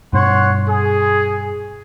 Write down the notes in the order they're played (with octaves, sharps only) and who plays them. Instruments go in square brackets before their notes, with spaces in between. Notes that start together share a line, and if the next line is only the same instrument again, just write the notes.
[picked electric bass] G2 B2 [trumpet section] C#5 F#5 C6
[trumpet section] G#4